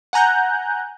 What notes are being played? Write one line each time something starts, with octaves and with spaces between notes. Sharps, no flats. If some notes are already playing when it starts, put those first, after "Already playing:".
F#5 G#5 A#5 F#6 G6